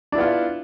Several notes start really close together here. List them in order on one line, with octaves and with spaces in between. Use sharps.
D4 E4 B3 F4